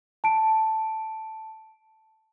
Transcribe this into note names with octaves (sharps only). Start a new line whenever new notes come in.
A5 D7